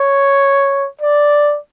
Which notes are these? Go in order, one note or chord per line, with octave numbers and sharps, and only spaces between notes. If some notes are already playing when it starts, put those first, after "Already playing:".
Already playing: C#5
D5